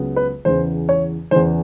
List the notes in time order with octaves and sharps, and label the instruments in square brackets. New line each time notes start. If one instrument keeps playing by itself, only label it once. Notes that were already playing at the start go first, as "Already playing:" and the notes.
Already playing: [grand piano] C#2 C#3 F#3 B3
B4
E2 C#3 E3 C5
C#5
E2 C#3 E3 C5